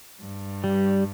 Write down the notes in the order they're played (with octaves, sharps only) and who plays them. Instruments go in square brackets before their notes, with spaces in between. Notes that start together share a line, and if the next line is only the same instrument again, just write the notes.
[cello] G2
[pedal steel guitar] G3